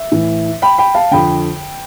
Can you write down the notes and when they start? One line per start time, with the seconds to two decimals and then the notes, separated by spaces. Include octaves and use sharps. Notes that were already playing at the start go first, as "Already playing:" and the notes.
Already playing: E5
0.12 A2 E3
0.62 G5 B5
0.78 G5 B5
0.95 F5 A5
1.11 F2 D3 G5 B5